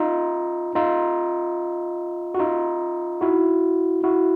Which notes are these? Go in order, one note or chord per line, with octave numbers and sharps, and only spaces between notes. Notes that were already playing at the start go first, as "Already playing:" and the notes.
Already playing: D#4 F4
D#4 F4
F#4
D#4 F4
E4 F#4
E4 F#4